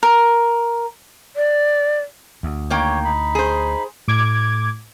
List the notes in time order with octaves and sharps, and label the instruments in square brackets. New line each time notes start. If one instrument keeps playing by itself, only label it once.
[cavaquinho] A#4
[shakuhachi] D5
[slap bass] D2
[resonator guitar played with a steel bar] D#3 A#3 G5 [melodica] C#5
[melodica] D#4 B5
[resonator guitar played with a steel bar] G#4 C5
[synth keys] A2 D6 G#6